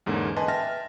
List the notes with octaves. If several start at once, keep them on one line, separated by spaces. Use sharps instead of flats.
E2 G#2 D3 A#3 C#4
B4 D#5 G#5 A5 C6
E5 G5 A5 F6 A6 A#6